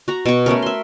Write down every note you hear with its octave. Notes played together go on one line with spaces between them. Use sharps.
F#4 A#5
B2 C#6
A3 B3 C#4 A#4
E5 C6